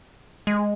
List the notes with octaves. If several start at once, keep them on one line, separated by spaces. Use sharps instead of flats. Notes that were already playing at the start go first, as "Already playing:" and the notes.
G#3